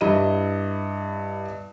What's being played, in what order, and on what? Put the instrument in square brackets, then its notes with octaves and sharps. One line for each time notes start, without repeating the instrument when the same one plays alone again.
[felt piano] G2 E4 G4 D#5 D#7